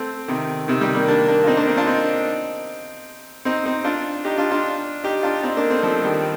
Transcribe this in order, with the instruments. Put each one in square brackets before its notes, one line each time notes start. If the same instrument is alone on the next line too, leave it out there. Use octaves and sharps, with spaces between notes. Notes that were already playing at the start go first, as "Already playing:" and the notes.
Already playing: [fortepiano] A3 C4
C3 D#3
C3 D#3
D#3 G3
G3 A#3
A#3 D4
A#3 D4
F4
C4 D#4
A#3 D4
C4 D#4
D4 F4
C4 D#4
C4 D#4
C4 D#4
D4 F4
D#4 G4
D4 F4
D4 F4
D#4 G4
D4 F4
C4 D#4
A#3 D4
A3 C4
F3 A3
D#3 G3